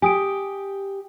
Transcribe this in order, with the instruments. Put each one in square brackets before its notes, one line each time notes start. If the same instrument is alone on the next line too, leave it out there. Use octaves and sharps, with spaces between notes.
[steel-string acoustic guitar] G4 [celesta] G#5 D#6 D7